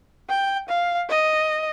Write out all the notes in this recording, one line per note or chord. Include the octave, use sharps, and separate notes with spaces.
G5
F5
D#5